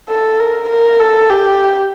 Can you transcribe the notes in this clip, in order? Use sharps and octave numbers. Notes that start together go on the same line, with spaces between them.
A4
A#4
A#4
A4
G4